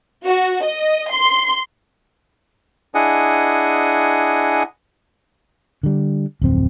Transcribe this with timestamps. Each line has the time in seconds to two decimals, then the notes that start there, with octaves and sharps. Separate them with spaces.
0.24 F#4
0.64 D#5
1.09 C6
2.95 D4 E4 G#4 D#5 F#5 G#5
5.83 D3 G3
6.42 D1 F2 C4